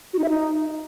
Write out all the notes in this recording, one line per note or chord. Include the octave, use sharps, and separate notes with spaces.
F#4
D#4
E5
D#4